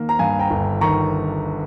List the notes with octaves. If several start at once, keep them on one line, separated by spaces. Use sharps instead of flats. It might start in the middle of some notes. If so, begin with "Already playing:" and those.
Already playing: D#3 A#3
A#5
G2 F5 G#5
G5 A#5
G1
D#3 A#5 C#6